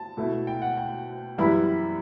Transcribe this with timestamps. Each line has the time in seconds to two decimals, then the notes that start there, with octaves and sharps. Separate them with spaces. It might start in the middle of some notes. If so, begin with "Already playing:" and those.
Already playing: A5
0.17 B2 A3 E4
0.47 G5
0.62 F#5
0.77 G5
1.38 F#2 E3 G3 B3 E4 B5